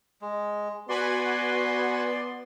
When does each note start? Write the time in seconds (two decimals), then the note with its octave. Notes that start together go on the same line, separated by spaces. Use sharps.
0.22 G#3
0.89 B3 F#4 B4 D5 G#5 C6